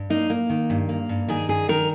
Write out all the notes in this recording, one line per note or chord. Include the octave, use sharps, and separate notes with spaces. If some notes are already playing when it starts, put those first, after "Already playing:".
Already playing: G2
A#3 D#4
A#3
D#3
G2
A#3
G2
D#3 G#4
G2 G#4
D#3 A#4